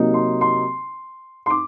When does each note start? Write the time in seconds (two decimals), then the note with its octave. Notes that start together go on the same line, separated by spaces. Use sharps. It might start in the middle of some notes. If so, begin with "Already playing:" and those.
Already playing: C3 F#3 A#3 D#4
0.14 C6
0.41 C6
1.46 C6
1.50 D6